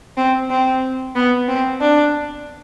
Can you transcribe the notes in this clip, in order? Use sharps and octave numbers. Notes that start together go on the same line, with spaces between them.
C4
C4
B3
C4
D4